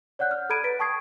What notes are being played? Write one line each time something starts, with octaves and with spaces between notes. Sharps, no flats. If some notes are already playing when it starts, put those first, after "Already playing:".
C#5 D5 F#5 F#6 G6
F6
A4 A#5 B5 G#6 D7 D#7
B4 A6 B6 D7
G5 A5 C#6 D#6 G#6 C7